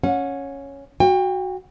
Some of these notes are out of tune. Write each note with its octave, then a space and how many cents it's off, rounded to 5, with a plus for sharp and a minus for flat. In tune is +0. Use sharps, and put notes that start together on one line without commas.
C#4 +0 F#5 -30
F#4 +0 G5 +30